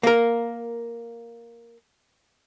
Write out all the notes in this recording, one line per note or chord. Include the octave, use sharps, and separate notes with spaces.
A#3 A#4